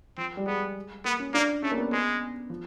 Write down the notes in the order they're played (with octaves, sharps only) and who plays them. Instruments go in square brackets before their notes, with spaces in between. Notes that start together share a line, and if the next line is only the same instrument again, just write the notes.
[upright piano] F3 [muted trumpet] C4
[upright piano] G3
[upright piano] G#3 [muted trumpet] B3
[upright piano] A#3 [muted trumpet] B3
[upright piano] C#4
[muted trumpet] A#3 [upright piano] D4
[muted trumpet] A3 [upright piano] C#4
[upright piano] A#3
B3
[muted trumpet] G#3 [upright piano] B3
[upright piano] F3